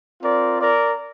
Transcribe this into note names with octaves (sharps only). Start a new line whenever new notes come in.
C4 F4 A#4 D5
A#4 D5